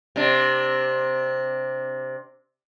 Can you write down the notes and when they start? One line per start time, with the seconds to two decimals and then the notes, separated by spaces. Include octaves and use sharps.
0.16 C3 D4